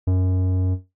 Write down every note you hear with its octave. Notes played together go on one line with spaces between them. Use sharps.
F#2